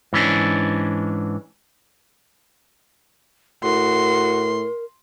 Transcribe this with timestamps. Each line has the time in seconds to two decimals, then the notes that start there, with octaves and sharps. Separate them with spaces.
0.13 G#2 E3 C#4 D4
3.64 A2 F#4 A#4 C6